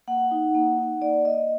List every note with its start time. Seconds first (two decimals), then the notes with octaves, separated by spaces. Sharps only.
0.08 A#3 F#5
0.31 D#4
0.55 A#3
0.78 D#4
1.02 A#3 D5
1.25 A#3 D#5